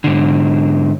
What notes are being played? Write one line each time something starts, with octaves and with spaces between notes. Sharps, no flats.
G#2 D3